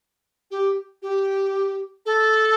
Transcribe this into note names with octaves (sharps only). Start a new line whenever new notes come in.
G4
G4
A4